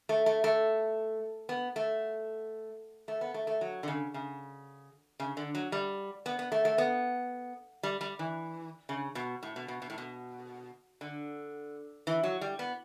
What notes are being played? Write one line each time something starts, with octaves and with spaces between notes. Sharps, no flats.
A3
A3
A3
B3
A3
A3
B3
A3
A3
F#3
D3
C#3
C#3
C#3
D3
F#3
G3
B3
B3
A3
A3
B3
G3
G3
E3
C#3
B2
A2
B2
B2
B2
A2
B2
D3
E3
F#3
G3
B3